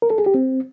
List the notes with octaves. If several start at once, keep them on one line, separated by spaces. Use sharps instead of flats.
A#4
A4
G#4
G4
C4